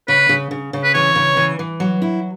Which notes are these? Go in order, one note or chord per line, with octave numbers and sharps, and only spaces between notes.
C#3 B4
C#3
C#3
C#3
B4
E3 C#5
C#3
E3
E3
F#3
E4